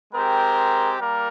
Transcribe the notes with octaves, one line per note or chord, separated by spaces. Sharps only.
G#3 C4 G4 A#4
G3 A#3 A#4